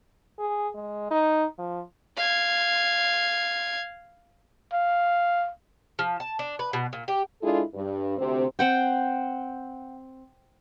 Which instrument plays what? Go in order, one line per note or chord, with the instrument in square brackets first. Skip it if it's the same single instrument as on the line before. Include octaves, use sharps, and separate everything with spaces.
[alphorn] G#4
G#3
D#4
F3
[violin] F5 G#6
[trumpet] F5
[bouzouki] F3
A5
D4
B4
B2
A#2
G4
[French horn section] G#3 D4 E4 F4 G#4 A4
G2
D2 C3 C4
[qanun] C4 F#5 G5